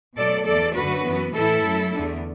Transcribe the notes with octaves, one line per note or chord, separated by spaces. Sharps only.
B2 F#3 A3 A4 D5
E2 E3 A3 A4 D5
F#2 D3 F#3 A3 F#4 B4
F#2 E3 B3
A2 E3 A3 E4 A4
F#2 F#3 A3
E2 D3 A3